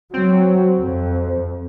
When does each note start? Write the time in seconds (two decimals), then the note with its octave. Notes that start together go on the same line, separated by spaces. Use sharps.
0.14 F#3 C4
0.82 F2